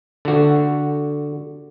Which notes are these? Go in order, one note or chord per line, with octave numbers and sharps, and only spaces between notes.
D3 F#4